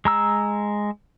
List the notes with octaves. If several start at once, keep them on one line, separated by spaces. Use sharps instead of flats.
G#3 A#5 E6